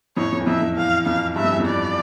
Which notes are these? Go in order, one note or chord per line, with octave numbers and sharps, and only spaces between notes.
F2 A2 C#5
F2
E2
F2 E5
F2
E2 F5
F2 F5
G2 E5
F2
E2
F2
D5